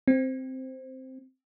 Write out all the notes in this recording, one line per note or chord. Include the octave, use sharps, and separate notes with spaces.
C4